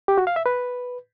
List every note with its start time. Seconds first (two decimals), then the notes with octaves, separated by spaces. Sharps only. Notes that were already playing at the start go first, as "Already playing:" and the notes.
0.08 G4
0.18 F#4
0.27 F5
0.36 E5
0.46 B4